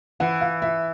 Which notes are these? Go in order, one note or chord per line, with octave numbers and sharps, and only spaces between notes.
E3 F#5
F5
E5